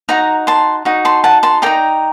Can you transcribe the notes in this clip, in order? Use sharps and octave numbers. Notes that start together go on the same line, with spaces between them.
D#4 F#4 A#5
A5 C6
D#4 F#4
A5 C6
F#5 A5
A5 C6
D#4 A4 D5 G5 A#5